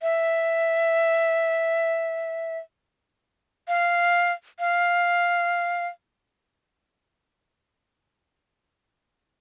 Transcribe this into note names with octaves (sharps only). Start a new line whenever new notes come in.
E5
F5
F5